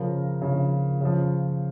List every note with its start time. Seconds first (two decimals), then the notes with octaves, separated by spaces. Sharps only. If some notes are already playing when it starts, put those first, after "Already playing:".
Already playing: C#3 F3 A#4
0.42 C#3 F3
1.01 C#3 F3